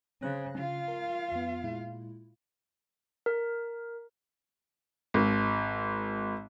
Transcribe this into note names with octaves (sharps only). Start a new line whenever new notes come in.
C#3 C5 F#6 A#6
C#3 F4 F5
A#4
F2 B3
A#2 G#3 E4
A#4
G#1